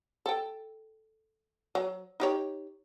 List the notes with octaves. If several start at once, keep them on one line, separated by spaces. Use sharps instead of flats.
A4 G5
F#3
D#4 G4 C#5